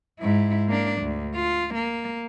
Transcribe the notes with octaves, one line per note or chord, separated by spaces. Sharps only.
G#2 E4
A#3 D4
D2
F4
A#3